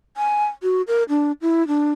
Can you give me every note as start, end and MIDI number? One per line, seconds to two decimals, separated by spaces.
0.17 0.46 80
0.63 0.82 66
0.88 1.03 70
1.09 1.32 62
1.42 1.66 64
1.68 1.92 62